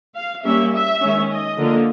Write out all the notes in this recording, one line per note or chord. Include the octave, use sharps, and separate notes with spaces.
F5
G3 A#3 C#4 E5
E5
D#3 G#3 C#4
D#5
D3 F3 A#3